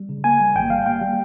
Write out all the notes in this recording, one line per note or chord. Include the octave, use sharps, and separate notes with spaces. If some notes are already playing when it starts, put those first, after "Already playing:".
Already playing: G3
C#3
A#3 G#5
G3
G#1 G5
G3 F5
A#3 G5
G3